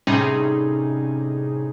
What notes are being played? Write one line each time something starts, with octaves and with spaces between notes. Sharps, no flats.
A2 C3 G3 C#4 D#4 G#4